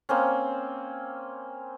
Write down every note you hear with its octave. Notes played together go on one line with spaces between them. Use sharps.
A#3 C4 C#4